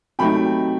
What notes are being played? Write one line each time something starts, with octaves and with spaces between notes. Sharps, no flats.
C3 F#3 A3 D#4 G5 B5